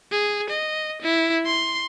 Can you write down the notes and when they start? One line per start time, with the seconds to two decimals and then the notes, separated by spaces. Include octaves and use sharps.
0.11 G#4
0.50 D#5
1.02 E4
1.46 C6